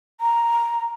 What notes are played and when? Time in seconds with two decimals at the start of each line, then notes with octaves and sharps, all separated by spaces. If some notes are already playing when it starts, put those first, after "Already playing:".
0.21 A#5